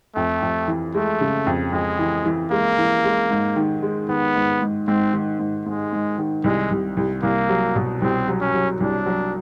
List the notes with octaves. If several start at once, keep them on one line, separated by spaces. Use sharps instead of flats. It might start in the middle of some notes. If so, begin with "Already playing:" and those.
F2 A3
F2
E3
G#3 A3
C#3
F2
F2 G#3
E3
E3
G#3 A#3
E3
G#3
G#2
D#3
G#3
D#3 B3
G#2
G#2
G#2 C4
D#3
G#2
G#2 G#3
G#2
D#3
C2 G#3
C2
C2
C2 A#3
F#3
B2
C2 C4
F#3
C#4
F#3
C2 D4
F#3